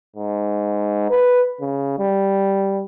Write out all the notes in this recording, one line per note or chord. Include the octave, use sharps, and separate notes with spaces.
G#2
B4
C#3
G3